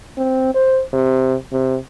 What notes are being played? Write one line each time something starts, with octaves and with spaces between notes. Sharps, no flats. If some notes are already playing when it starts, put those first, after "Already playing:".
C4
C5
C3
C3